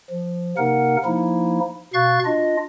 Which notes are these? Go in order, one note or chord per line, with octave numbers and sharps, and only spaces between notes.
F3
C3 A#3 D#4 A#4 F#5
F3 A#3 D#4 E4
B2 F5 C#6 F#6 A6
D4 F4 D#5